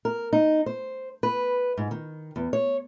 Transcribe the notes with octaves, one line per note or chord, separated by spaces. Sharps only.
A#4
D#4
C5
B4
G#2
D#3
E2
C#5